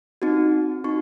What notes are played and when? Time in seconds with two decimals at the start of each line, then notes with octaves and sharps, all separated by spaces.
0.22 C4 D#4 F#4
0.84 C4 D#4 F#4 C#6